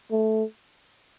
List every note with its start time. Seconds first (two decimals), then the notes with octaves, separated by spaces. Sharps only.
0.11 A3